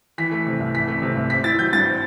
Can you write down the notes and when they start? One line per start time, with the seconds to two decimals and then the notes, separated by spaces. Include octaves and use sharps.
0.18 E3 B6
0.32 A3
0.46 C3
0.60 C2
0.75 E3 B6
0.88 A3
1.02 C3
1.16 C2
1.30 C4 B6
1.44 E4 A6
1.59 F#3 G6
1.73 G2 A6
1.87 C4